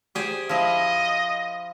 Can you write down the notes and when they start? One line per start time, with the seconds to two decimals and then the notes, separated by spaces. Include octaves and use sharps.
0.15 G4 G#4 C5
0.49 F3 E4 D#5